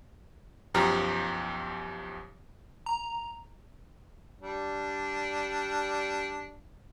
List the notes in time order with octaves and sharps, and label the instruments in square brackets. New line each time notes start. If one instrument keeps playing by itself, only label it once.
[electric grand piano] B1 F#2 F3 G4 A#5 F6
[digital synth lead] A#5
[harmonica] G3 D4